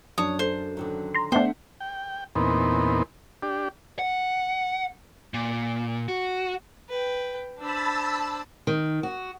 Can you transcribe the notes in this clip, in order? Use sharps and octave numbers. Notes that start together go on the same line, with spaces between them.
F#2 D4 C#5 D#6
A4 C5
D3 D#3 F#3
A#5 C6
D3 A3 B3 D4 C5 E5 F#5 G5
G5
E2 A#2 B3 C4 D#4
D4 G4
F#5
A#2
F#4
B4 G5
D4 C5 A5 B5 E6
D#3
F#4